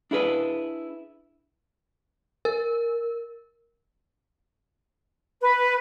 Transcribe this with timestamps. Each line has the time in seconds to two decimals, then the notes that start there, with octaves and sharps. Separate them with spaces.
0.11 D4 E4 G#4 B4
2.45 A#4
5.41 B4